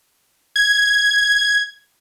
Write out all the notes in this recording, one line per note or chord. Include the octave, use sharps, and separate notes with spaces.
G#6